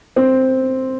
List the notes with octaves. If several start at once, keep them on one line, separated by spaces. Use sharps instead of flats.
C4